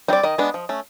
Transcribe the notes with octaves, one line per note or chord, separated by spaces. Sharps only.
G3 C4 D#4 D5
D#3 D#5
G#3 B3 D4
F3
A3 C#4